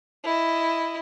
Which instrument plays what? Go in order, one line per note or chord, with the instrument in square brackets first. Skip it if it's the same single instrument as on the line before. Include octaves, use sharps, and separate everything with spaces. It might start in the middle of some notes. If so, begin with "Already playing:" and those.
[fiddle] E4 D#5